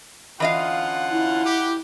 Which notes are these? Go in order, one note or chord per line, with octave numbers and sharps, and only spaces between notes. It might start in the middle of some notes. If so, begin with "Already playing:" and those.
D3 E3 C#4 F4 D#5 F5 F#5
E4
G4